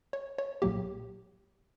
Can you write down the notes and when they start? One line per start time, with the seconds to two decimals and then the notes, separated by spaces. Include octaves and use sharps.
0.13 C#5
0.38 C#5
0.62 B1 A#2 F#3 A#3 G4